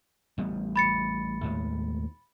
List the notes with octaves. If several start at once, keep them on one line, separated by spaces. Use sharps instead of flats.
A1 G3 B3
B5 A6 C#7
D#2 A2 G#3